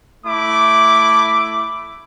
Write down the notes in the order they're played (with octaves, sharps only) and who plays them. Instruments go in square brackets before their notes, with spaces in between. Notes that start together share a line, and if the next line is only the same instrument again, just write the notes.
[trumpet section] A3 E4 D6